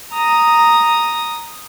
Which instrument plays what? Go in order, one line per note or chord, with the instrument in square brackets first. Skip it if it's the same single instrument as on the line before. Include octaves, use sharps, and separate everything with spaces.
[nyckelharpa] A#5 D#6